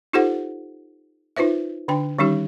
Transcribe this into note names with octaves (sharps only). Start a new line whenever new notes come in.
D#4 F4 G4 A4 C5 F#5
D#4 F4 B4 C5 E5
D3 D4 G5
D#3 G3 C#4 D#4 G4